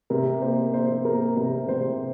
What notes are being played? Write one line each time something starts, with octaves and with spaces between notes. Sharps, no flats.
C3 A#4
A#3 C5
A#3 C5
A#3 A#4
C3 A#4
C3 C5